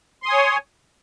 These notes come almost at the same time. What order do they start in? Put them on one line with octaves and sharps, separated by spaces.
C6 D#6 G#5 C#5